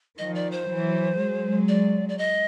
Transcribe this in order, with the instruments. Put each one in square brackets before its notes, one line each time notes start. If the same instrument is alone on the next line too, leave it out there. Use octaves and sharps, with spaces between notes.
[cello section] D#3 F3 [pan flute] D#5
[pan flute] D5
C5
[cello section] E3 F#3
F#3 G#3
[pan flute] D5
D5
D#5